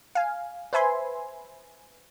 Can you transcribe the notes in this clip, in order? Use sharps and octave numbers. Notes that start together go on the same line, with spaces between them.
F5 G#5
B4 C5 E5 G#5 B5 C6